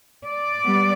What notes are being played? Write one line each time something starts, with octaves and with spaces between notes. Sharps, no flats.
D5
G3 B3